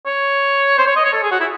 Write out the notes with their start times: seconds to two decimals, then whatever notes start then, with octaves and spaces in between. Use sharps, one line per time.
0.06 C#5
0.78 C5
0.87 C#5
0.96 D#5
1.05 C#5
1.13 A4
1.23 G#4
1.31 F#4
1.40 E4